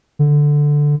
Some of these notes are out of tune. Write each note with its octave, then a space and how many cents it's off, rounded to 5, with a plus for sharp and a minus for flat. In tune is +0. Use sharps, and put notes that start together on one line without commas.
D3 +0